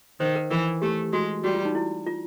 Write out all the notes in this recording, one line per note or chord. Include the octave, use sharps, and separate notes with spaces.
D#3 C5
A#4
E3 A#4
A3 G4
G#3 F#4
G3 F#4
F4
D#4
E4
F4